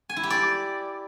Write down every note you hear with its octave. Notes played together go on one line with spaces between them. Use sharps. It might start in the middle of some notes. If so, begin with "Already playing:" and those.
G#5
E4
G4
D5